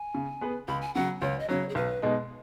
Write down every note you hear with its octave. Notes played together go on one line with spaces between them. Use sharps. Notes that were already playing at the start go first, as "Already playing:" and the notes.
Already playing: G#5
C#3
B3 G#4 B4
C#2 B5
G#5
C#3 F#3 F#5
C#2 C#5
D#5
C#3 F#3 C#5
G#4
B1 B4
B2 G#3 D#4